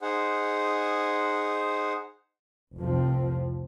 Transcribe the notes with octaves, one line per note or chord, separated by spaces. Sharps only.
D#4 G#4 C5 F#5
F1 C2 F2 F3 C4